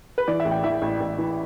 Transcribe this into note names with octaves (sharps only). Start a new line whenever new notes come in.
B4
E3 D5
E5
A1
G5
E3 E5
A1
A1
E3